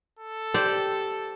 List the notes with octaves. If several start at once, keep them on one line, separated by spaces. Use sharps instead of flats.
A4
G4 C5 D5